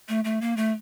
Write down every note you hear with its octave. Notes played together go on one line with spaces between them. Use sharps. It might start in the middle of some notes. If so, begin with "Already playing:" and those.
A3
A3
A#3
A3